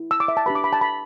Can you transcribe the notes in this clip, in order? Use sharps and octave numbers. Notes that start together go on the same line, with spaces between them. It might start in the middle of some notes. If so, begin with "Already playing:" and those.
Already playing: E4
E6
D6
E5
A5
D4 G4 B4 B5
D6
B5
A5
B5